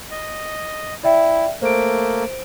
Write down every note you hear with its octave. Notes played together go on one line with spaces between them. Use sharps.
D#5
E4 D5 E5 G5
A3 A#3 C5 D7